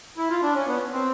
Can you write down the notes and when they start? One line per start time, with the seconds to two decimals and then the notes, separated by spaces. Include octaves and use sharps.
0.18 E4
0.30 F4
0.43 D4
0.55 C#4
0.67 B3
0.92 C4